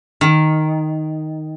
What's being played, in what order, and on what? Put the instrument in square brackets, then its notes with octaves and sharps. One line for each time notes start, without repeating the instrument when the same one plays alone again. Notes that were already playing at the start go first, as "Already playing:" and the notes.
[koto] D#3